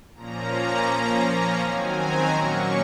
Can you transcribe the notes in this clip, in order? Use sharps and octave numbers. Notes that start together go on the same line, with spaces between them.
A#2 F3 A#3 C#4 A#5
F3 A#3 C#4 A#5
A#5
D#3 F#3 C4 G#5
A#5
A#2 F#3 A#3 C#4 C#6